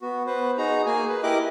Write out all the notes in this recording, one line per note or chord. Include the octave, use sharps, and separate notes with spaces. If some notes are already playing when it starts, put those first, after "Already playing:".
B3 F#4
B3 B4 C5
D#4 F#4 G#4 A#5
A#3 G#4 G#5
B4
E4 G4 A#4 D#5 D6 F#6